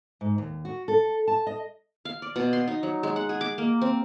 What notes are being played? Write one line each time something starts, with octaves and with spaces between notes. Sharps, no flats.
G#2
D#2
F#4
A4
A5
D#5
F5
D5
B2
C6
D#4
F#3
G#3
F#5
G#4
D6
A#3
C4